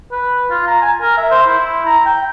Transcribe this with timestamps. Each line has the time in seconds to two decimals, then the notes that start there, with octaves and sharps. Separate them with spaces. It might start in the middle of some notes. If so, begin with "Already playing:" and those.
0.11 B4
0.51 F4
0.67 A#5
0.82 G#5
1.01 A#4
1.17 E5
1.31 C5
1.46 E4
1.86 A#5
2.06 G5